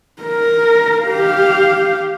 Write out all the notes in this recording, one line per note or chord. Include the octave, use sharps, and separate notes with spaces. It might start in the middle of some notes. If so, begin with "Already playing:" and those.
A#4
G4 F5